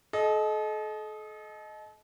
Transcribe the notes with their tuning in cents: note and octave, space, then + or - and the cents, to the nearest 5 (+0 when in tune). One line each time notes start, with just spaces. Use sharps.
A4 -40 D#5 +0